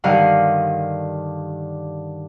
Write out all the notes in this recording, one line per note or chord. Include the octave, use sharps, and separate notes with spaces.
G2 D3 D#3 A#4 F5 F#5